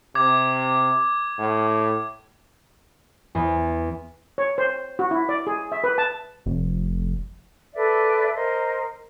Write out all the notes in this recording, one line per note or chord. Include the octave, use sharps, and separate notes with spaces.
C3 D6 G#6
A2
E2
C#5
C5
F#4
E4
D5
G#4
E5
B4
A5
F1
A4 B4 D5 E5
A#4 C5 D#5